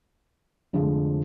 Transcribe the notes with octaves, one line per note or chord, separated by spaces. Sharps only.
F1 F2 D3 F3 G#3